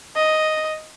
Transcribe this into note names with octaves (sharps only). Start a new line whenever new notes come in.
D#5